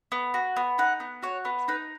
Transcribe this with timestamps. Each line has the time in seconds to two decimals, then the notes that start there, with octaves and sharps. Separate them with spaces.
0.12 B3
0.34 F#4
0.56 B3
0.78 D#4 F#5
1.00 B3
1.22 F#4 C#5
1.45 B3
1.68 D#4 B4